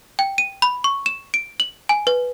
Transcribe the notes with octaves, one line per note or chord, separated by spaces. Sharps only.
G5
D#7
B5
C#6
E7
D7
F#7
G#5
B4